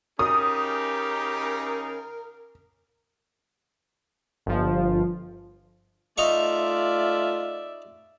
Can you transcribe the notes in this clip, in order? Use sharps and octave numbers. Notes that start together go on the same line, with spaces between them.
C#3 C#4 D#4 G4 A#4 D#6
G1 F3
A3 D#4 F4 D5 E5 F5 C#6